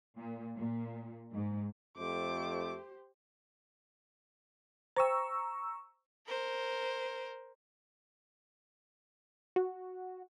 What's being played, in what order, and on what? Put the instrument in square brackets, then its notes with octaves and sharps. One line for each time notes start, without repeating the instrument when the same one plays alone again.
[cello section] A#2
A#2
G#2
[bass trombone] F2 [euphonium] A3 [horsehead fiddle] G4 C5 [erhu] D6
[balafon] C5 G5 [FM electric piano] A#5 C#6 E6
[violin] A#4 C5
[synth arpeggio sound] F#4